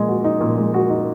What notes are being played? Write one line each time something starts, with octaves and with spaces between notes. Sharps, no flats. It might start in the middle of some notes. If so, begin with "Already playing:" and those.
Already playing: A#2 G#3
F#4
D#4
A#2
G#3
F#4
D#4